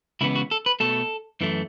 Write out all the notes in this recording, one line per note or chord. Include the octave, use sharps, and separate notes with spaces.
C#2 C#3 E3 B3 E4
F#4
A4
B4
B2 A3 A4
F#2 E3 A3